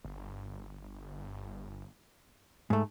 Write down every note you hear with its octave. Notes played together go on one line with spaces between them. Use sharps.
G1
G#2 A3